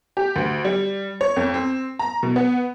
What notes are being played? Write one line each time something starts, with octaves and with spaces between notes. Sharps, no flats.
G4
D2
G3
C#5
F2
C4
A#5
B2
B3